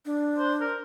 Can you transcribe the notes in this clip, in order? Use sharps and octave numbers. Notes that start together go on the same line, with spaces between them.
D4
C5
A#4